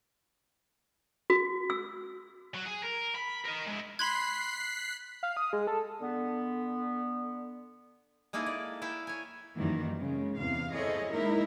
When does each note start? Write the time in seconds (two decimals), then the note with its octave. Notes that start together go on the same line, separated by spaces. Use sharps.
1.30 F#4
1.70 E6
2.55 F#3
2.66 G#4
2.84 A#4
3.16 B5
3.46 A#4 D#5
3.67 G#3 E4
3.99 B5 C6 F#6 G#6 B6 C7
5.23 F5
5.37 D#6
5.53 G#3
5.67 A4
6.00 D3 B3
8.33 G#3 A#3 D#4 E4 G#4 A4
8.46 D5
8.82 A3 E4 E5 F5 G5
9.07 C#5 G#5
9.56 F#2 D#3 E3 G3 A#3
10.01 C#3 G#3
10.39 E2 C3 F5
10.74 E4 G#4 A4 C5 C#5 D#5
11.11 G#3 A#3 D#4 E4 A#4